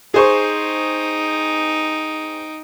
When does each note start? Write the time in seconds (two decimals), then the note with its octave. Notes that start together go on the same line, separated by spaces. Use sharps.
0.14 D#4 G#4 C5 G5 C#6